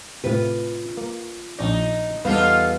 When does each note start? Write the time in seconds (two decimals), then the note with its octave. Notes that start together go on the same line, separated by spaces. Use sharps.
0.24 A2 C3 F4 B4
0.97 A#3
1.59 A#1 C#4 D#4 D5
2.25 E2 G3 B3 D#4 F4 A4 B4 F5